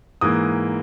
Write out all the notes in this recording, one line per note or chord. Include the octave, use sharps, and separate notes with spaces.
G#2 E3 A#3 D#6